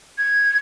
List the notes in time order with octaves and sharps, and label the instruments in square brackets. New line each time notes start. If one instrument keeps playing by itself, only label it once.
[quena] G#6